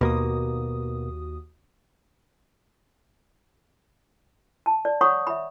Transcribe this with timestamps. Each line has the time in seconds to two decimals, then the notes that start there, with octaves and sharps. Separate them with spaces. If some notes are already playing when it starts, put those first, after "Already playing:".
0.01 D#2 B2 A#3 F#4 D#6
4.66 A5
4.85 D5
5.01 C#5 F#5 B5 C#6 D#6
5.27 E5 B5